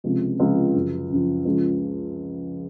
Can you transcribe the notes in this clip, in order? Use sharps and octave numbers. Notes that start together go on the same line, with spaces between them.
C#2 C3 F3
C#2 C3 F3
F#2 C#3 F3
F#2 C#3 F3
C#2 C#3 F3